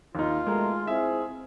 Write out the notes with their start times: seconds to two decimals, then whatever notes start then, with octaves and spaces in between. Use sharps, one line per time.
0.15 D#2 D#4 F4
0.47 B2 G#3 A3 A#4
0.87 C4 E4 G#4 E5